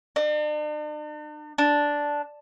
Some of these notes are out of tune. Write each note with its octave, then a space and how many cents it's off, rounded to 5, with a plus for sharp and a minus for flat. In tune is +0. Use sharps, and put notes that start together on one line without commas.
D4 +45
D4 -5